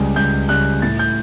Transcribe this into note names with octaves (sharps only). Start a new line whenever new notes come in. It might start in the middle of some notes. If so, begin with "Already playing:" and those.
Already playing: C#2 C#3 G3
C#2 G6
C#3 G3 F#6
A2 A6
G6